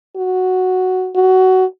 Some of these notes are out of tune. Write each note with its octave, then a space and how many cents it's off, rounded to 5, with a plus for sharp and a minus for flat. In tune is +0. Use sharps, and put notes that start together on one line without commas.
F#4 +0
F#4 +15